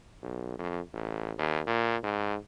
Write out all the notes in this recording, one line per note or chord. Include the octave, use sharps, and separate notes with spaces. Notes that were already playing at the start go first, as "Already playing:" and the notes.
B1
F2
A1
D#2
A#2
G#2